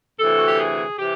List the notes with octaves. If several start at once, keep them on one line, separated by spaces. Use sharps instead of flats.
D2 C3 E3 A4
F#4
G4
G#4
C3 E3 G4